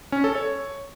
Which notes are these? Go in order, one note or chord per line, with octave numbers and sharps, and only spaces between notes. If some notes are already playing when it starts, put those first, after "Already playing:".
C#4
A4
C#5